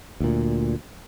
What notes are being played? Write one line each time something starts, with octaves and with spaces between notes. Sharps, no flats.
D2 A#2